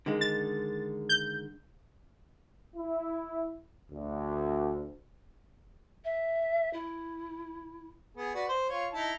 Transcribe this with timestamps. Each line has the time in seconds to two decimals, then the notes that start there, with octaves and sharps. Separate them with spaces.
0.06 D3 D#3 G#3
0.21 A6
1.09 G6
2.76 E4
3.90 D2
6.04 E5
6.73 E4
8.17 B3 G#4
8.35 F#4 B4 D5
8.49 C5
8.69 F4 C#5
8.93 D#4 E4 A5